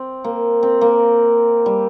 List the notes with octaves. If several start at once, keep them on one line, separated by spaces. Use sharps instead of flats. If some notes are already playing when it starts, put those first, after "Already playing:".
Already playing: C4
A#3
C4
A#3
G3